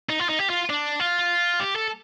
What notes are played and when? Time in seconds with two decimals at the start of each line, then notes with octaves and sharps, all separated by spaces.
0.09 D#4
0.20 F4
0.29 D#4
0.39 G4
0.50 F4
0.70 D4
1.00 F4
1.60 G4
1.76 A4